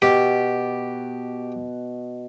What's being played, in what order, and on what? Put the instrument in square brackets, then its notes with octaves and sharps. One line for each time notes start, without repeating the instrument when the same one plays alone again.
[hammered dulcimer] B2 [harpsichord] G4